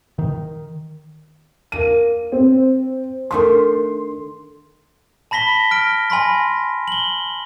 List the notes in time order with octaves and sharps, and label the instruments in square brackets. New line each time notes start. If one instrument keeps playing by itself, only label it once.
[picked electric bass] D#3
[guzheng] A#3 [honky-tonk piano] D#7
[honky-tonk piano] C4
[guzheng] D#3 A3 D4 [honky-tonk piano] C6
[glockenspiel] A5 B5 A#6 B6 G7
F6 A#6 D7
G#5 B5 C6 A#6
F#7 G7